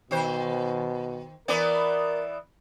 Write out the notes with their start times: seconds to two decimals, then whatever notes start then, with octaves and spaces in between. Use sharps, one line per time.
0.11 B2 D#3 C5
1.48 E3 B3 A#4 D5